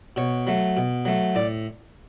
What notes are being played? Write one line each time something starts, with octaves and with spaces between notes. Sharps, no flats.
B2 C#5
F#3 A3
B2
F#3 A3
A2 D5